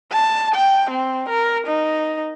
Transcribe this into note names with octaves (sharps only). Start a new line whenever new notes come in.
A5
G5
C4
A#4
D#4